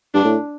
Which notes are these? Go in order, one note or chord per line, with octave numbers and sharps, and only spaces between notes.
G2 D4
A2